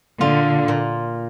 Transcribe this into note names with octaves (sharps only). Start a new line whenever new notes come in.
A#2 D3 F4
A#2